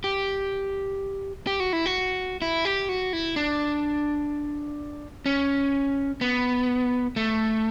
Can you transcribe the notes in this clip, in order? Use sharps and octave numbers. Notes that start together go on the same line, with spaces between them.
G4
G4
F#4
E4
F#4
E4
G4
F#4
E4
D4
C#4
B3
A3